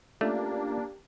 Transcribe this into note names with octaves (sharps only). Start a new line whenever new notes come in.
A3 A#3 C#4 D4 F4 G4 D5